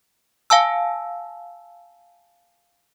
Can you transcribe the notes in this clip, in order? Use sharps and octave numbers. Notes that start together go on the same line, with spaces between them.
F5 G#5 A5 E6